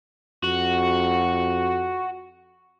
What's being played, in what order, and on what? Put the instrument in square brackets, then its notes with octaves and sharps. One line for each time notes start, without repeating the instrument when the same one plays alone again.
[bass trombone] F2 [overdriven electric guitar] F#4